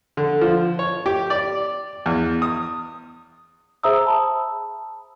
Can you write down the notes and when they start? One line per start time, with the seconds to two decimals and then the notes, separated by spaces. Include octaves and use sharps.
0.17 D3
0.41 F3
0.79 C#5
1.06 G4
1.30 D5
2.06 E2
2.42 D#6
3.83 G#4 C5 E5 A#5 D#6 E6
4.07 A5 B5